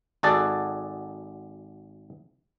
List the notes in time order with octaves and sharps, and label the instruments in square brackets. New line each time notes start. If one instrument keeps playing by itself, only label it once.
[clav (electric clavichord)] G#1 F#4 G#4 A4 D5 A5